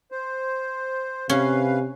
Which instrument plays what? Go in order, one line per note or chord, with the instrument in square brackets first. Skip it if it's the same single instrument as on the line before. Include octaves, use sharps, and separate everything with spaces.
[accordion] C5
[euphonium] C3 [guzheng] C#4 [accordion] B4 F5